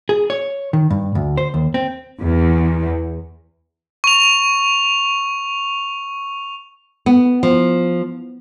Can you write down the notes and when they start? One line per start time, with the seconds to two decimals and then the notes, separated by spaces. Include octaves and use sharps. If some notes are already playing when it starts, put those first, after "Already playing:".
0.09 G#4
0.30 C#5
0.73 D#3
0.90 G2
1.15 D2
1.38 C5
1.54 D#2
1.74 C4
2.21 E2
4.04 C#6 F7
7.06 B3
7.43 F3